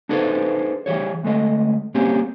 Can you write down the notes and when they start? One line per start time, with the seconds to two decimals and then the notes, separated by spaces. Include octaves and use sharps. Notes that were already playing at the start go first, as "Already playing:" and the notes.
0.09 D4 D#4 G#4 A4 B4 C5
0.86 E3 G3 G#4 C#5
1.23 D2 G#3 A3 D#5
1.95 G3 A#3 C4 C#4 G4 G#4